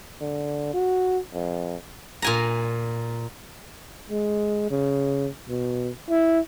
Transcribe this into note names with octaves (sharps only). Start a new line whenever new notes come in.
D3
F#4
F2
A#2 G#5 A#5
G#3
C#3
B2
E4